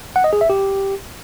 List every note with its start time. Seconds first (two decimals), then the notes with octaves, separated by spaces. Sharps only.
0.16 F#5
0.24 D#5
0.33 G#4
0.41 E5
0.50 G4